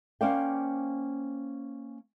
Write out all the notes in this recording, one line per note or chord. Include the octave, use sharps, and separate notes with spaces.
A#3 C#4 C5 D5 F5 G5